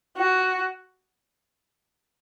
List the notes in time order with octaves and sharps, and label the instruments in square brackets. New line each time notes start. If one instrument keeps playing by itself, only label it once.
[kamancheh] F#4